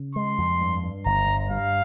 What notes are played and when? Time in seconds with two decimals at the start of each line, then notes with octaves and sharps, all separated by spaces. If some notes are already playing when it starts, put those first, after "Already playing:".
Already playing: C#3
0.15 G#3 C6
0.38 F2
0.61 G2
0.83 G2
1.06 G1 A#5
1.27 G2
1.50 G2 F5